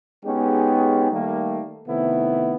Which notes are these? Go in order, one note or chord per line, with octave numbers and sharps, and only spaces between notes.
G#3 B3 C#4 D#4 G4 G#4
D#3 G3 A3 A#3
C3 D#3 A3 B3 E4